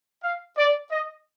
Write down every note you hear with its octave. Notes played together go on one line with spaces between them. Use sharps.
F5
D5
D#5